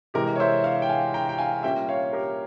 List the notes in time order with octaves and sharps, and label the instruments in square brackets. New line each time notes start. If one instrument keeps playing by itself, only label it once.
[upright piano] C3 E3 G#3 G4 A#4
C#5
C5 E5
C#5 F5
G5
F5 G#5
G5 A#5
G5
F5 G#5
A#2 G3 A#3 C#4 E5 G5
C#5 F5
G4 A#4